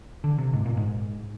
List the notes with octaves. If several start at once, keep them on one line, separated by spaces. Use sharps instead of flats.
D3
C3
G#2
A#2
G#2